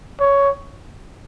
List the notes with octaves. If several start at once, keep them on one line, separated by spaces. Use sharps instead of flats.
C#5